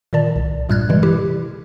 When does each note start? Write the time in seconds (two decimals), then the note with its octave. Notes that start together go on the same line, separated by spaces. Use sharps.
0.13 A#2 D#3 D5 A5
0.36 C2
0.69 G2 A#2 G3 F6 F#6 G#6
0.89 C3 E3 G3 G#3
1.03 E4 G4